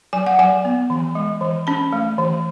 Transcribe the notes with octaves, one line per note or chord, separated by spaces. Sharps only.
F#3 G#5
F#5
F#3 G#5
B3
E3
G#3
E3
C#4 B5
A3
E3